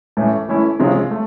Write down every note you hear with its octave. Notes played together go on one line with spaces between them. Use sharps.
A2 E3 A3 C#4
E3 A3 C#4 E4
C3 F3 G#3 C#4 F4
A3